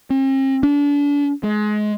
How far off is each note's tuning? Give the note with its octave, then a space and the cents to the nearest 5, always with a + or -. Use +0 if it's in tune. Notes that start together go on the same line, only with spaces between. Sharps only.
C4 +45
D4 -35
G#3 +25